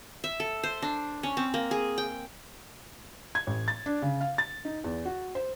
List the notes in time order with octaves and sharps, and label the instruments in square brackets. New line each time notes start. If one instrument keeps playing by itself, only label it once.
[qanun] E5
A4
C5
D4
C#4
C4
A#3
G#4
G5
[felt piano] G#6
A1
A6
D4
C#3
F5
A6
D#4
E2
F#4
C5